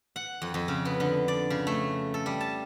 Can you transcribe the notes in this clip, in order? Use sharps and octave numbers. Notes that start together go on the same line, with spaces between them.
F#5
F2
F2
C#3
B3
D3
D5
C#3
A3
A4
G3
A5